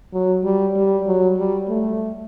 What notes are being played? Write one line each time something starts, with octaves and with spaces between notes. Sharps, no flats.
F#3
G3
G3
F#3
G3
A3